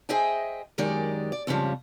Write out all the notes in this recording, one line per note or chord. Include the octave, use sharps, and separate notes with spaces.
G#4 C5 D#5 E5 G5 G#5
F#2 D#3 G#3 D4 G4 D5
D5
F2 G#2 C#3 F3 G3